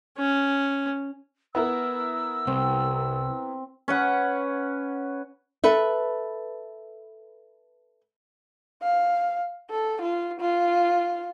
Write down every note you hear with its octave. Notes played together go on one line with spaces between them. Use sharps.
C#4
B3 E4 A#4 E6
C2 C4
C#4 B4 F#5
A4 B4 E5
F5
A4
F4
F4